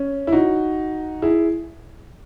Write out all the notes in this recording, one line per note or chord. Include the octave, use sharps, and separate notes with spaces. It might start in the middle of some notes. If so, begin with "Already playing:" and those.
Already playing: C#4
E4
D#4 F#4
E4 G#4